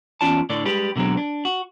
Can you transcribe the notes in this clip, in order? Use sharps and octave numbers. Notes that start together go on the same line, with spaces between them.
E2 C#4 F4 D5 A5
A2 D3 D4 D5
G3 G#3 G4 B4
B2 D3 F#3 G#3 C4
D4
F#4